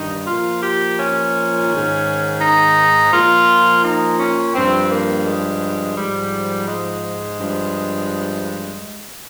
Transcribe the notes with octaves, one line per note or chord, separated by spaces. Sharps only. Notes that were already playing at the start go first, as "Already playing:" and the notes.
Already playing: G2 D#3 D#4
A#2 F3 F4
G4
C#4
G#2 D#3
D#4
A#2 F3 F4
D#4
C#4
G2 F3 C4
A#3
G#3
G#2 F3 G3
G#3
G2 F3